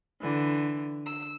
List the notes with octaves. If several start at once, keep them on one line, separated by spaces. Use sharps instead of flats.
D3 E3
E6